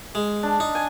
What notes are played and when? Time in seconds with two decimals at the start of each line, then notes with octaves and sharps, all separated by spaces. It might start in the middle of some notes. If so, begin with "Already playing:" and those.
0.15 G#3
0.43 D4
0.60 D#4
0.75 G#5